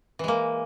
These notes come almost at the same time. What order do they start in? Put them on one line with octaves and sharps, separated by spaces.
E3 G#3 A#3